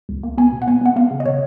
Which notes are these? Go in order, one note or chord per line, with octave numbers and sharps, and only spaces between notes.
C#2
A#3
B3 G#5
B2
F#5
B3 G#5
B3 F#5
B3 F5
C#3
D#5
C#3 C#5